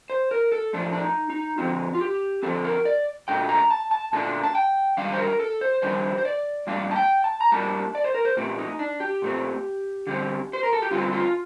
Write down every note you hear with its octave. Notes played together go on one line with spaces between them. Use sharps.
C5
A#4
A4
A2 F3 A3 D4
D4
D#4
D#4
D3 F3 C4 F4
F4
G4
D3 F3 C4 A4
A#4
D5
A#2 A3 D4 G5
A#5
A5
A5
A#2 A3 D4 A5
A5
G5
D#3 G3 D4 F5
C5
A#4
A4
C5
D#3 G3 D4 C5
C5
D5
A2 G3 A#3 D4 F5
A5
G5
A5
A#5
A2 G3 A#3 D4 A5
D5
C5
A#4
C5
A#2 A3 C4 G4
D#4
D4
G4
A#2 A3 C4
D3 G3 C4
C5
A#4
A4
G4
D3 G3 C4 F4
F4